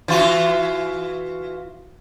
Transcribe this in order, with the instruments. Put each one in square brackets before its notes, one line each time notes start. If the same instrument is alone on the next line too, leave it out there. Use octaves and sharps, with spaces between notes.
[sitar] E3 F4 F#4